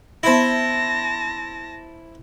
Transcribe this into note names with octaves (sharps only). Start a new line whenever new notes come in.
B3 E4 C5 E5 A5 A#6